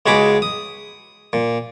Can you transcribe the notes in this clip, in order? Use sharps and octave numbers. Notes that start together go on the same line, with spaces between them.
C#2 G#3 F#4 G#4 B5 D6
D#6
A#2